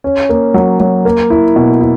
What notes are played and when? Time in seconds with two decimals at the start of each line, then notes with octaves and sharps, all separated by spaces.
0.04 C#4
0.29 A#3
0.54 F#3
0.80 F#3
1.05 A#3
1.30 E4
1.56 B2
1.81 E4